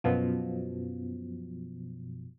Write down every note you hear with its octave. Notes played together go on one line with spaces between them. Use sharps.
F#2 B2 F3